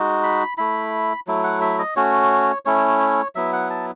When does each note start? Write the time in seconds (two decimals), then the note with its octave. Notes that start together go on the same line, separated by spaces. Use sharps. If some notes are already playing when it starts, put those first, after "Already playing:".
Already playing: G#3 D#4 F#4
0.23 B5
0.58 A3 E4 B5
1.27 F#3 A3 E4
1.44 F#5
1.61 E5
1.79 D#5
1.96 A3 C#4 F#4 C#5
2.65 A3 C#4 E4 C#5
3.35 F#3 B3 E4 E5
3.53 F#5
3.70 A5